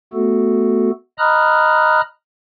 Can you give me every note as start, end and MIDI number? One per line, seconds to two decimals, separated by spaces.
0.13 0.90 57
0.13 0.90 59
0.13 0.90 66
0.13 0.90 69
1.18 2.01 75
1.18 2.01 82
1.18 2.01 83
1.18 2.01 87
1.18 2.01 89
1.18 2.01 90